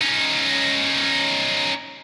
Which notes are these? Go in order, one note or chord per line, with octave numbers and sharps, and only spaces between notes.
C#4 D#4